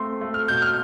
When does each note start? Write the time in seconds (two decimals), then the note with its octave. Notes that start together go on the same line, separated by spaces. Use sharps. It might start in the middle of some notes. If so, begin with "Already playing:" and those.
Already playing: A3 C4 C6
0.21 A3
0.34 F6
0.48 B2 G6
0.62 F6